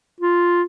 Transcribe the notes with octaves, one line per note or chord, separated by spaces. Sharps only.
F4